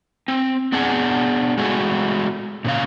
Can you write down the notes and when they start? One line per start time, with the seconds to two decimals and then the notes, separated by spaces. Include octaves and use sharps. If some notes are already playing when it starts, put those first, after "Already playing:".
0.28 C4
0.72 B3 D4 G#4 F#5
1.57 G#3 A3 F#4 G#4
2.64 A#2 C#3 F5